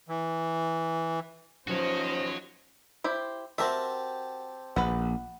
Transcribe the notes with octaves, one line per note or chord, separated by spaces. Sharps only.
E3
D#2 F3 B3 C#4 F#4 C5 C#5 D#5
E4 G4 C5
C4 F#4 G4 A#4 E5 A5
A#1 B4 F#5